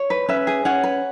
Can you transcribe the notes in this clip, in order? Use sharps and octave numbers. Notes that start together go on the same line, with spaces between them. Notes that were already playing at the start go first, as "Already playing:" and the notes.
Already playing: C#5
B4
C#4 B4 E5
G#4
C#4 C#5 F#5
B4